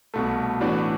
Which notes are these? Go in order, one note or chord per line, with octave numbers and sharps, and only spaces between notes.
C2 B2 A3
A2 E3 B3 D4 F#4